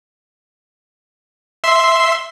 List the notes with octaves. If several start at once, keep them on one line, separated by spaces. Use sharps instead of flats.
E5 C6